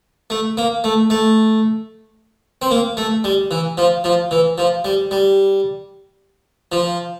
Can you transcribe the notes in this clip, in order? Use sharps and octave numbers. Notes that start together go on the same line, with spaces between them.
A3
A#3
A3
A3
C4
A#3
A3
G3
E3
F3
F3
E3
F3
G3
G3
F3